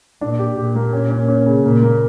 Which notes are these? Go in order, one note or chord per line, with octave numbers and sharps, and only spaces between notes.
A#2 D4
G4
A#2 G4
A#3
C#4
C#4
C#4
C#3
A#2 A#3
A#3